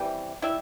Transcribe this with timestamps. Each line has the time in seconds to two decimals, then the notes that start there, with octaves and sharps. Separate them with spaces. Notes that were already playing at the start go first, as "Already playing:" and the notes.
Already playing: C3 E3 G3 G4 G5
0.42 G3 E4 E5